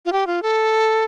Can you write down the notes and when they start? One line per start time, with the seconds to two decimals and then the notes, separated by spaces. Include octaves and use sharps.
0.05 F4
0.13 G4
0.27 F4
0.42 A4